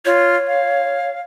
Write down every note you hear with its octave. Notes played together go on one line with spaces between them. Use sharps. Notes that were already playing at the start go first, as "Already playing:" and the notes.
F4 C#5
F5